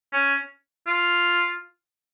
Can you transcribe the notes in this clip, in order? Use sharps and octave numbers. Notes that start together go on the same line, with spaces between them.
C#4
F4